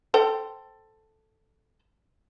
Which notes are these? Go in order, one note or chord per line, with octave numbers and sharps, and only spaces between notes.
A4 C5 G5